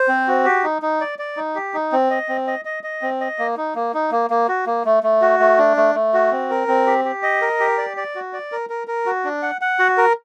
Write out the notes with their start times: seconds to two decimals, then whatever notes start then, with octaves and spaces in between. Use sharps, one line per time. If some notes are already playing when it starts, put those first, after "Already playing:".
Already playing: C5
0.08 C4
0.28 F#4
0.45 G4
0.64 D#4
0.82 D#4
1.01 D5
1.19 D5
1.37 D#4
1.55 G4
1.74 D#4
1.92 C4
2.11 D#5
2.29 C4
2.47 D#5
2.65 D#5
2.83 D#5
3.02 C4
3.21 D#5
3.39 A#3
3.57 D#4
3.75 A#3
3.94 D#4
4.12 A#3
4.30 A#3
4.48 F#4
4.66 A#3
4.85 A3
5.03 A3
5.22 F#4
5.40 A3
5.58 D4
5.77 A3
5.95 A3
6.14 F#4
6.31 C4
6.50 A#4
6.68 C4
6.86 G4
7.05 G4
7.23 D#5
7.42 A#4
7.60 G4
7.78 D5
7.97 D5
8.15 F#4
8.33 D5
8.52 A#4
8.70 A#4
8.88 A#4
9.06 F#4
9.25 D4
9.43 F#5
9.61 F#5
9.79 F#4
9.98 A#4